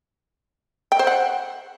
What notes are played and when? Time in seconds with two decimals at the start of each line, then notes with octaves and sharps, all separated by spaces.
0.92 G5
0.99 C5
1.07 F#5